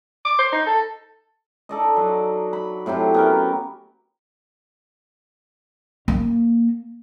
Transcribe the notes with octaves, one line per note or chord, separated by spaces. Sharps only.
D6
C5
D#4
A4
D#4 A4 D5 D#5
F#3
B5
A2 C3 F#3 G4
B3 C#4 A#4
A#3